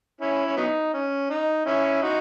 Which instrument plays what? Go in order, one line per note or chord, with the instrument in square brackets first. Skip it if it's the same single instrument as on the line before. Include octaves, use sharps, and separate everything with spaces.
[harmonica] C#4 E4
C#4
F#3 B3 D#4
C#4
D#4
C#4 E4
D#4 F#4